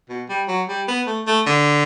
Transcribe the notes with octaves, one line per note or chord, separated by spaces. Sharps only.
B2
G3
F#3
G3
B3
A3
A3
D3